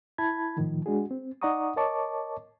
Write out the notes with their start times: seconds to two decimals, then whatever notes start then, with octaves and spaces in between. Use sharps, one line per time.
0.18 E4 A5 B5 G#6
0.57 A2 D#3 F3
0.86 G#3 D4 F#4 G#4
1.11 C4
1.42 D#4 D5 F#5 A#5 C#6 D#6
1.76 A#4 C#5 D#5 A5 C#6 D6